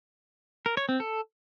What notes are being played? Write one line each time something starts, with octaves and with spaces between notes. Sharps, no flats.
A#4
C#5
C4
A4